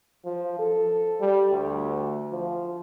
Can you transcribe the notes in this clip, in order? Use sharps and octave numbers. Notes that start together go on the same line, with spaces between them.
F3
A4
G3
D2
F3